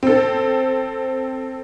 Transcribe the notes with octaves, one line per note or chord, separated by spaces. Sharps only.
C4 A4